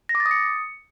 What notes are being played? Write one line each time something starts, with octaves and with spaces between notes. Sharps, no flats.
A#6
D6
A6
D#6
C#7